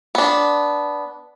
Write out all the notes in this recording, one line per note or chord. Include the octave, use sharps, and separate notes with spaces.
B3 D4